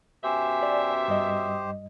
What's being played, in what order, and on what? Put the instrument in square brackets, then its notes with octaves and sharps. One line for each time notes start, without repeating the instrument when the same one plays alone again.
[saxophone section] F#2 B2 E5 [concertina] G4 C5 [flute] G#5
[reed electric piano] D5
[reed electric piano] G2 G3 D#5 [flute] D#6